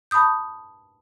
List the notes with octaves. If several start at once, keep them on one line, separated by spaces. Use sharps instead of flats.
A5 B5 C#6 D#6 G6